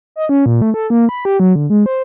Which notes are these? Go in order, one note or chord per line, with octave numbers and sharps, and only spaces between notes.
D#5
C#4
A#2
A3
A4
A#3
B5
G4
F#3
D3
G#3
C5